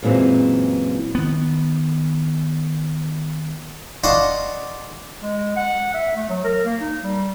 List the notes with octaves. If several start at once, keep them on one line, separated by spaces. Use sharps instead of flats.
F#2 A#2 E3 G#3 C4
D#3 B3
D4 D#5 F5 F#5 C6 C#6
G#3
F#5
E5
A3
F#3
A#4
A#3
D#4
G3